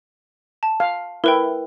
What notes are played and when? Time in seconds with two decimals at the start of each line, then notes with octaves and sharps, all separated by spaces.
0.63 A5
0.80 F5
1.24 E4 A#4 B4 G5